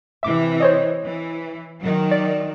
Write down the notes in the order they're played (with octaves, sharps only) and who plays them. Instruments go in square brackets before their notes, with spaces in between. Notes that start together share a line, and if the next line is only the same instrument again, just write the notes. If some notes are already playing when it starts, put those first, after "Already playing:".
[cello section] C3 E3 [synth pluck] E5 D6
[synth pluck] C5 C#5 D#5
[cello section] E3
D#3 F#3
[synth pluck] D5